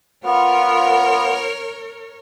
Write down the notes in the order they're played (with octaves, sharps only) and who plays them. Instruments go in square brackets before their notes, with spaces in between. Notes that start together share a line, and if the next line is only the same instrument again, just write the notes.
[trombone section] B3 F4 [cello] A#4 C#5